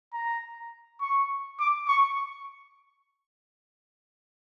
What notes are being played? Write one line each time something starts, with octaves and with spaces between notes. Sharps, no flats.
A#5
C#6
D6
C#6